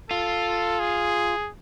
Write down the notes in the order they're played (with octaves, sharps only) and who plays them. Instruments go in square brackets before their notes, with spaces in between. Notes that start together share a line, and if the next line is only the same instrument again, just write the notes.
[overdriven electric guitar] F4 [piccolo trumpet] A4
[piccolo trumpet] G#4